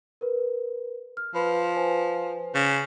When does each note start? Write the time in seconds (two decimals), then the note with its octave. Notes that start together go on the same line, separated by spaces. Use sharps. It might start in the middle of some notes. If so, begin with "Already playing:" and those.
0.21 A#4 B4
1.17 F6
1.35 F3 B4 B5
1.76 B4 C5 G#5
2.54 C#3